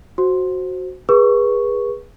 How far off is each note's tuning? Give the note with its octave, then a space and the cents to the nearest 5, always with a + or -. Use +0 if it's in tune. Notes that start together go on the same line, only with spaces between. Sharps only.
F#4 +0 C5 +5
G#4 -20 B4 -30 C#6 +0